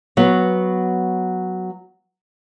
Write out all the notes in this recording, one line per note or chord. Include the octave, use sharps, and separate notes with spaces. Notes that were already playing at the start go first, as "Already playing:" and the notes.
F#3 B3 C#5